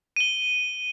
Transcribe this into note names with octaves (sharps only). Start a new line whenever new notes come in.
D#7 G7